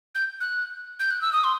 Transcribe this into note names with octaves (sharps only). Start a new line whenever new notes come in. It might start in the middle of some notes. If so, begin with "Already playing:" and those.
G6
F#6
G6
F#6
E6
D#6
C6